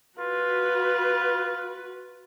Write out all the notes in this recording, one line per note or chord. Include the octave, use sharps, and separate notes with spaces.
F4 F#4 B4